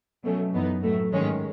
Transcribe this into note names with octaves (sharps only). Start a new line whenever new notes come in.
B2 F#3 A3 C#4
F#2 E3 B3 D#4
A2 F#3 A3
G#2 D#3 G#3 C#4